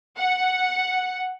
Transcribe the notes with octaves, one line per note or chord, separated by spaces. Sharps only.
F#5